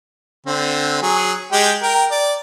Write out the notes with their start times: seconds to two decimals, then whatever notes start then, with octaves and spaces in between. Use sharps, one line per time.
0.46 D3 C4
1.02 F#3 G#4
1.52 G#3 G4 G5
1.83 A#4 G5
2.11 D5